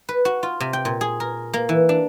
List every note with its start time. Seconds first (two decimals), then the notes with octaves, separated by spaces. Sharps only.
0.09 B4
0.25 F#4
0.43 F4
0.60 C3
0.73 G5
0.85 A#2
1.01 G#4
1.20 A#4
1.53 A#3
1.69 E3
1.89 D4